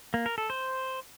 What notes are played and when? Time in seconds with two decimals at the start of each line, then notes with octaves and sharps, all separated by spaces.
0.14 A#3
0.26 A#4
0.38 A4
0.50 C5